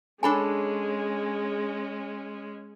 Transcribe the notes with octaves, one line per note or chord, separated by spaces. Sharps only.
G#3 C#4 D4 G#4 A4 C#5 G#5 B5